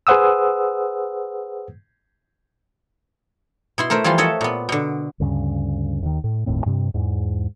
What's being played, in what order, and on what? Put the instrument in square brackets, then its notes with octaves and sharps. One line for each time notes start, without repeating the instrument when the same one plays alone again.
[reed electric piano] G#4 B4 C5 F#5 D#6 E6
[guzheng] B2 E4 C6
A3 A#4 C5 E5
E3 F3 G3 F4 C6
A4 C#5 D#5 E5 F#5
A#2 B3
B2 D3
[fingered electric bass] D2 G2 C#3
D#2 D#3
A2
G1 D#2 A2 C4
G2 C3
E2 G#2